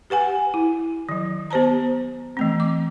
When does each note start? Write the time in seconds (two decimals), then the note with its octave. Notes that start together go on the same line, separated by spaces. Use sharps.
0.10 G4 B4 F#5 G#5
0.54 E4
1.09 D#3 F#3
1.51 B3 G4 C5 A5 A#5
2.37 E3 A3 C4
2.60 D6